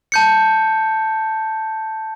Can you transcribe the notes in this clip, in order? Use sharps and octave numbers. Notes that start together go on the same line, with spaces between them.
A5 G6 C#7